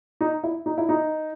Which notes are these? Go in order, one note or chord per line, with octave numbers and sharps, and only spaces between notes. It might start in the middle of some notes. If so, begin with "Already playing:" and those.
D#4
E4
D#4
E4
D#4